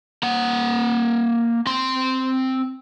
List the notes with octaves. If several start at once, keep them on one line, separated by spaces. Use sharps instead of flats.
A#3 F#5
C4 C6